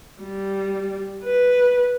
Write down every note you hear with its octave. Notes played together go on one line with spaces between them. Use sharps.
G3
B4